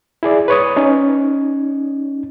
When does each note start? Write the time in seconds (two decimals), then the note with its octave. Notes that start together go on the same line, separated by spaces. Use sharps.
0.23 E4 G#4 D5
0.48 B4 C#5 D#6
0.76 C#4 D#4